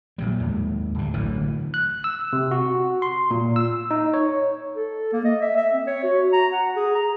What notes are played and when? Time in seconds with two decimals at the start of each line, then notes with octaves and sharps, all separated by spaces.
0.18 A#2 F#3 G3
0.40 D#2 G#2
0.95 D1 G2
1.14 A1 D3 E3 F#3
1.74 F#6
2.04 E6
2.33 C3
2.51 F#4
3.02 C6
3.31 A#2
3.56 E6
3.91 D#4
4.14 C#5
4.76 A4
5.12 A#3
5.25 D#5
5.41 E5
5.56 E5
5.73 C4
5.87 C#5
6.03 F#4
6.33 A#5
6.53 F#5
6.76 G#4
6.95 A#5